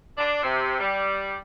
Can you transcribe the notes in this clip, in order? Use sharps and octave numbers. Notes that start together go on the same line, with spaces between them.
D4
C3
G3